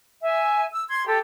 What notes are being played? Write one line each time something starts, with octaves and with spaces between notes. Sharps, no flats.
E5 G#5
E6
C6 G#6
G4 A4